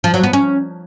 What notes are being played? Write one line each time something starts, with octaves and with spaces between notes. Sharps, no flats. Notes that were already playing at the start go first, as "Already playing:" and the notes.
F3
F#3
B3
C#4